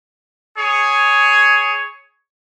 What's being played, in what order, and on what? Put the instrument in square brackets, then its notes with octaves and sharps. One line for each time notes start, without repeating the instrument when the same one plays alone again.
[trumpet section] G#4 C#5